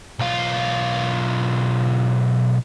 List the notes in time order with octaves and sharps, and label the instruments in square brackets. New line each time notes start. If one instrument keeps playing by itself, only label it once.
[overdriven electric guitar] B1 F4